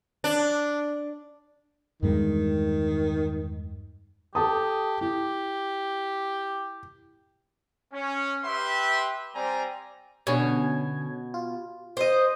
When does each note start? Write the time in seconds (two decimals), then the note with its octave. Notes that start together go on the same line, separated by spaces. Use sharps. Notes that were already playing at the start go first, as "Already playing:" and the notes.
0.24 D4
2.03 E2 G2 D#3 G#3
4.35 G4 A4 A5 D#6
5.01 E4 G4
7.94 C#4
8.45 G4 B4 E5 G5 C6
9.35 G3 C4 D5 G#5 A#5
10.27 B2 D3 C#4 G#6
11.34 F4
11.97 C5 D#5